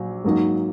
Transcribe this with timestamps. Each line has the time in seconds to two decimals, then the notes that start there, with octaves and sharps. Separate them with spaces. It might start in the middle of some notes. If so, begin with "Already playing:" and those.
Already playing: A#1 F#3
0.24 G#2 F#3 A#3 D#4